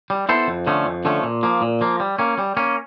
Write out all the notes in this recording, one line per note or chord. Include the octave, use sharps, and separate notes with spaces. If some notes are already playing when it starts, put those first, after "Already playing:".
G3
B3 E4 A4 C5
F2
D3 F3 A3 C#4
F2
D3 F3 A3 C#4
A#2
F3 A#3
A#2
F3 A#3
G3
A#3 C#4
G3
A#3 C#4